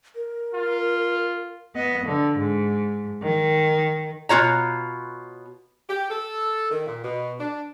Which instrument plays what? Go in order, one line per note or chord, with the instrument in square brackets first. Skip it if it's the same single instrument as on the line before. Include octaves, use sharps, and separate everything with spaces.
[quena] A#4
[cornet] F4
[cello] B3 D#5
D3
G#2
D#3
[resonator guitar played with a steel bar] B2 F4 C#5 A#5
[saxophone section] G4
A4
D#3
A#2
B2
D4